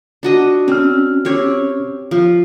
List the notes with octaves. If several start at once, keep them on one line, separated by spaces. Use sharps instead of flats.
D4 F#4 D#5
C4 C#4 F6
C4 G4 C#5
F3